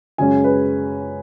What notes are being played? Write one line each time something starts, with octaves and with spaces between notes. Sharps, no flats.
F#2 C#3 G#3 C#4 G#5
B4